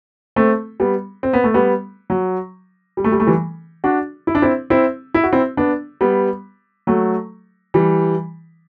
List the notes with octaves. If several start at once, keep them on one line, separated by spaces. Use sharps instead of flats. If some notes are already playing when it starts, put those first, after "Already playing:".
A3 C4
G3 B3
C4
B3
A3
G3 B3
F#3
G3
A3
G3
A3
E3 G3
D4 F#4
E4
D4
C4 E4
C4 E4
E4
F#4
C4 E4
B3 D4
G3 B3
F#3 A3
E3 G3